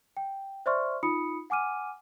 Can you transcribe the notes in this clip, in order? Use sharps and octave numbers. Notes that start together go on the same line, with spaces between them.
G5
C5 D5 E5 C6 C#6 F6
D#4 F4 B5 D#6 C#7
F#5 G#5 D6 F6 D#7